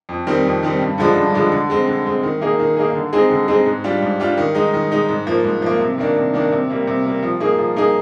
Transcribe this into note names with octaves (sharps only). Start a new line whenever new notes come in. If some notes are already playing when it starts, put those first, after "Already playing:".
F2
D#3 G3 C4
F2
D#3 G3 C4
G2
D3 F3 G#3 D4
G2
D3 F3 G#3 D4
D3
G#3 C4
D3
G#3 C4
D#3
A#3 D#4 G#4
D#3
A#3 D#4 G#4
D3
G#3 C4 D#4 G#4
D3
G#3 C4 D#4 G#4
G#2
G3 D4 F4
G#2
G3 D4 F4
D#3
G#3 D#4
D#3
G#3 D#4
G#2
F3 A#3
G#2
F3 A#3
C3
D#3 A#3 D4
C3
D#3 A#3 D4
C3
G3 A#3
C3
G3 A#3
F3
A#3 D#4 G#4
F3
A#3 D#4 G#4